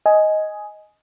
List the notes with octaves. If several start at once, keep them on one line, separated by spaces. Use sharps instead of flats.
D#5 G#5